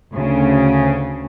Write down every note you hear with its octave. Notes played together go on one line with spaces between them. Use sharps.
D2 C#3